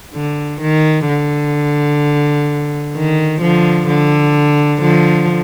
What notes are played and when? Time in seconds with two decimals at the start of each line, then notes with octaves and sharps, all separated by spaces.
0.14 D3
0.61 D#3
1.09 D3
2.96 D#3
3.42 D3 F3
3.88 D3
4.81 D3 F3